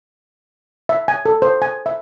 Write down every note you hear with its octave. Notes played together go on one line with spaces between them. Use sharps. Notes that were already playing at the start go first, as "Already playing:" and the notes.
E5
G#5
A4
C5
G#5
E5